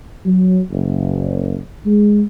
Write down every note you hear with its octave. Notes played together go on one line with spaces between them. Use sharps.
F#3
F#1
G#3